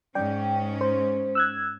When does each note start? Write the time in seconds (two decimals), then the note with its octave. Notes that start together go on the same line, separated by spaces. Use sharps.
0.15 G#2 C#4 D5 G5
0.81 C5
1.35 E6 F#6 G#6